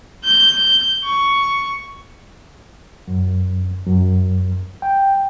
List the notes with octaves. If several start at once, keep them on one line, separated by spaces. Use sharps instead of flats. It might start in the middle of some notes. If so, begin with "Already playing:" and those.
G6
C#6
F#2
F#2
G5